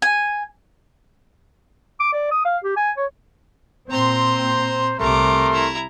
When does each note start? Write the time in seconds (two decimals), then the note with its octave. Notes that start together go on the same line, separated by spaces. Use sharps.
0.02 G#5
2.00 D6
2.12 D5
2.31 D#6
2.45 F5
2.64 G4
2.76 G#5
2.97 C#5
3.90 A#2 C4 C5 A#5 C6
4.99 C2 C3 A3 A#4 A#5 C6 D6
5.52 E4 A#5